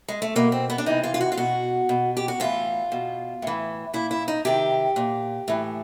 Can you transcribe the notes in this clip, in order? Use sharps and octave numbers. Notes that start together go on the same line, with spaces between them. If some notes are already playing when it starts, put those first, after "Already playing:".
G#3
A3
B2 A#3
C4
B3
D4
C3 E3 D#4
F4
F4
F#4
F4
B2 F#4
B2
G4
F#4
A2 E3 F4
B2
A2 E3
A#2 E4
E4
D#4
C3 D#3 G4
A#2
A2 E3